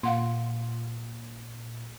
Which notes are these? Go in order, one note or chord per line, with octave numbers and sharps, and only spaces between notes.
A#2 F5 F#5 C6